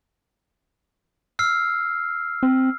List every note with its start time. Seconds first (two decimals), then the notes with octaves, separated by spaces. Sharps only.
1.39 E6 F6 C7
2.43 C4